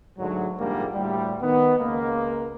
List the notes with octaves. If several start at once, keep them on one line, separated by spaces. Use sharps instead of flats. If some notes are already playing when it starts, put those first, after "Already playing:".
D2 G#2 D3 F#3
A#1 G#2 D3 G3 A#3
D2 A2 G3
D#3 B3
C#2 A#3